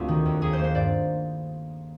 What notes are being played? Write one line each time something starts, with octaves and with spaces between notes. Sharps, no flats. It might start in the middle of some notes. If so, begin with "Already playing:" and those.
Already playing: D2 C4 F4 G4
D#3
D#2
D#2 G#4
C5
A#3
C5
G2 D5